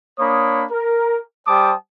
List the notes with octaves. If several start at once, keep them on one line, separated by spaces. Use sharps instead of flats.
A#3 D4 C#5 B5 D#6
A#4
G3 C5 G5 A5 D6 D#6